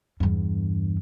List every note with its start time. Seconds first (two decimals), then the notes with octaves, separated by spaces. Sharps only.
0.20 E2 G2